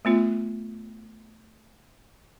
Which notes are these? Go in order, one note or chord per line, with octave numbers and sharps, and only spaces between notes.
A3 B3 F4